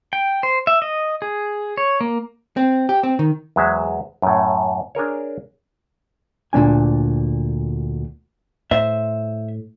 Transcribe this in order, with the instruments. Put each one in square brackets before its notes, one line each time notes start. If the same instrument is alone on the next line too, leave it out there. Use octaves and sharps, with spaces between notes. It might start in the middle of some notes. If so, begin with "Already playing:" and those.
[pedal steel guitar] G5
C5
E5
D#5
G#4
C#5
A#3
[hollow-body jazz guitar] C4
G4
C4
D#3
[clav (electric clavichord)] E2 F#3 G#3 C5 E5
F#2 A2
D4 G#4 A#4 C#5
[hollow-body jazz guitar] D2 A#2 A3 D4 G#5
[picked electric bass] A2 [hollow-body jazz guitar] C5 E5